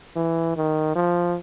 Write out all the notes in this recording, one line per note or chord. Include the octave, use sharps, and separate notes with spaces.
E3
D#3
F3